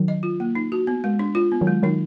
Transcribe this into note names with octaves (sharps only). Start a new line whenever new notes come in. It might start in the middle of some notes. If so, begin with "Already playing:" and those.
Already playing: D#3 F#3
D#5
F4
A#3
D#4
F#4
B3
G#3
D4
F4
B3
D#3 F#3
G#3
D#3 F#3 D#4